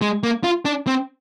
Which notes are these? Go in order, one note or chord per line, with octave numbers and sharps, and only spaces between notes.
G#3
A#3
F4
D4
C4